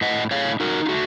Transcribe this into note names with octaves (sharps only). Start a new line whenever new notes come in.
A2 D#5 F#5
A2 C#5 F5
D#4 F#4 A#4
F4
A3 F#4